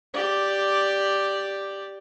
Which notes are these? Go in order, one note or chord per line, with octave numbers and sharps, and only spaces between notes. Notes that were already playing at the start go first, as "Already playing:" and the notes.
G4 D5